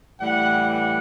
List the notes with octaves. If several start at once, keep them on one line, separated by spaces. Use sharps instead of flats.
A2 E3 G3 F#5
F#5